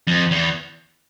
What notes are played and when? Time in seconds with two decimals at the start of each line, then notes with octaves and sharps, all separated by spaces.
0.07 F2
0.31 E2